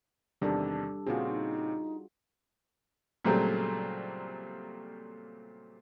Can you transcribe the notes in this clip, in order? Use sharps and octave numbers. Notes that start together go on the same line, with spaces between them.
E2 C3 D#3 G3 D4 A4
A#2 C#3 C4 F4 F#4 G#4
D#4
A#2 C#3 F#3 G3 A3 C4